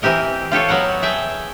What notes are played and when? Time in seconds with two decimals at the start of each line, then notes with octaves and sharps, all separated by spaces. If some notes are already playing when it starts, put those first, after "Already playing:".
0.02 E3 C4 G4 A#4 D#5
0.52 F4 G4 A4 C#5
0.69 F#3 B3 A#4 F#5
1.02 G#4 E5 G5 A5